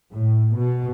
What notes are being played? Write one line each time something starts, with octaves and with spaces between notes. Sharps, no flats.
A2
B2